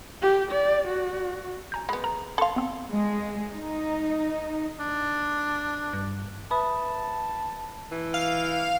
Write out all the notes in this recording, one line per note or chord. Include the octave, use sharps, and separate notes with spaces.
G4
D5
F#4
G#5 A#5 G6
G#3 B3 B5
A#4 A#5
A4 F5 B5 C6
B3 C4
G#3
D#4
D4
G2
B4 E5 A5 B5 D#6
E3
F5